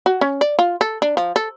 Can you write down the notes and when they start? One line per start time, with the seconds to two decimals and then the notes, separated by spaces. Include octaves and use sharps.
0.06 F#4
0.21 C#4
0.41 D5
0.59 F4
0.81 A4
1.02 D4
1.17 F3
1.36 A4